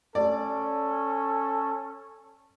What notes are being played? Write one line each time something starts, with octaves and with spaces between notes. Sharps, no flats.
C#4 A4 D5